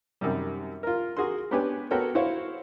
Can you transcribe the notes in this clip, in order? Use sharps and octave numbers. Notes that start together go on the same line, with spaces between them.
F#2 C3 D#3 G3
F4 A#4
F#4 G#4 A#4 F#5 C6
B3 C#4 D4 G4 B4 G#5
B3 F#4 A4 A#4 C#5 G5
E4 F#4 C5 C#5 F5